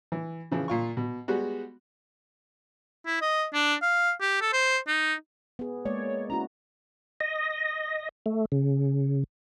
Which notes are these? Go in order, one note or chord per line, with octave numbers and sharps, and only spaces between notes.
E3
C#3 E3 F3
A#2 F4 C#6
B2
G3 G#3 B3 F#4
E4
D#5
D4
F5
G4
A4
C5
D#4
B3 G#4
G#3 A#3 C#5 D5
C#4 E4 F#4 A#5
D#5
A3
C#3